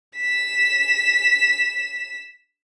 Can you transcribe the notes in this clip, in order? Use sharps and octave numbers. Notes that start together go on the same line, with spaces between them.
B6 E7